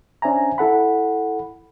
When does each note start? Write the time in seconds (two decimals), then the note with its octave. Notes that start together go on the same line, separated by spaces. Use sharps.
0.22 C#4 D4 C5 E5 G#5 A#5
0.58 E4 A4 F#5 B5